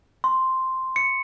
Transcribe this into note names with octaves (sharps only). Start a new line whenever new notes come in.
C6
C#7